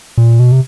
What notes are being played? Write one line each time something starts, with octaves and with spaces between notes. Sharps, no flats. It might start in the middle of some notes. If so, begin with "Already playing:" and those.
A#2
B2
C3